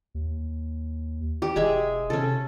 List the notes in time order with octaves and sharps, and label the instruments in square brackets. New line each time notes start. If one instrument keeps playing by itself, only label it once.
[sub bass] D#2
[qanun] G4
[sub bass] E1 [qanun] G#3 G#4 E5
[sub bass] C3 [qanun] C#4 A4